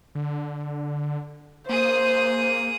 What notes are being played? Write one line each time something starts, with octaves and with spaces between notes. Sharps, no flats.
D3
A#3 G#4 C5 D#6